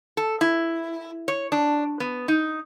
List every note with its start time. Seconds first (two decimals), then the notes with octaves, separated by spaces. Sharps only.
0.17 A4
0.41 E4
1.28 C#5
1.52 D4
2.00 B3
2.28 D#4